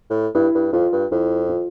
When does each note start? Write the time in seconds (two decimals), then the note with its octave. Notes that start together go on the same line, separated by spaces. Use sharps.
0.10 A2
0.35 G2 E4
0.55 G2
0.73 F2 F4
0.92 G2
1.11 F2 E4
1.49 F4